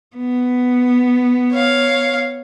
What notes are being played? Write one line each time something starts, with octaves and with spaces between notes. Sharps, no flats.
B3
C#5 F5